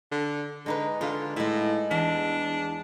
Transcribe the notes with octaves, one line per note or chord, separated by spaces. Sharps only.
D3
D3 G#3 D#4 B4
D3 F4
A2 G#3 E5
E2 D4